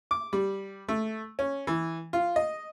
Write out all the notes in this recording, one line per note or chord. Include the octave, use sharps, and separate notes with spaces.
D6
G3
A3
C#4
E3
F4
D#5